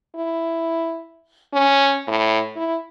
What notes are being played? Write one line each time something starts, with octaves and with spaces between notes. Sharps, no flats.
E4
C#4
A2
E4